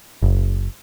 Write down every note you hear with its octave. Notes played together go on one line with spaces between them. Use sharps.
F#1